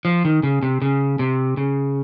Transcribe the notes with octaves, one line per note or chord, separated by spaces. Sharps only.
F3
D#3
C#3
C3
C#3
C3
C#3